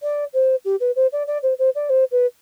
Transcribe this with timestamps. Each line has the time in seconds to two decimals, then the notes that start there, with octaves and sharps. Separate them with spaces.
0.03 D5
0.34 C5
0.65 G4
0.80 B4
0.96 C5
1.12 D5
1.27 D5
1.43 C5
1.59 C5
1.75 D5
1.89 C5
2.11 B4